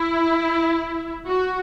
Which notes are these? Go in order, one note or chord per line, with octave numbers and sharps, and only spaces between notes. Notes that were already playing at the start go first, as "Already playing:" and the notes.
Already playing: E4
F#4